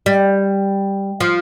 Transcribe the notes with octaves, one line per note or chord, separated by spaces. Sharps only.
G3
F3